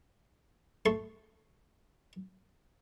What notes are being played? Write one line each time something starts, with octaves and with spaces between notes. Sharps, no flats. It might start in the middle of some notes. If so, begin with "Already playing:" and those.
A3 A4 C6 C#6